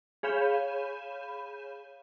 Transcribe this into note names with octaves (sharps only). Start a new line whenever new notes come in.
G#4 C#5 F5 B5 G6 E7